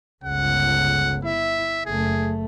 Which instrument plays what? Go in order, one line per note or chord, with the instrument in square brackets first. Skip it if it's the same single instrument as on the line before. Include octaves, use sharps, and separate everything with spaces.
[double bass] G1 C#2 [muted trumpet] F#5
[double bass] E4 [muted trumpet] E5
[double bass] F#1 A3 [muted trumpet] G#4